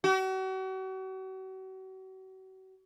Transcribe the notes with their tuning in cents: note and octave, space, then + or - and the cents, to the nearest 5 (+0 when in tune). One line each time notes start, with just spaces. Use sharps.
F#4 +40